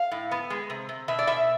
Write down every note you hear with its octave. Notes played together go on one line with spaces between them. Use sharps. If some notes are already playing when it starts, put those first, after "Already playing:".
Already playing: F5
A2
B3
G#3
C3
C3
B2 E5
D5
B2 E5